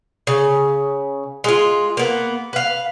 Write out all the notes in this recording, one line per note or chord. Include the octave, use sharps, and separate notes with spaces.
C#3
G#3 F4
A#3 B3
B4 F5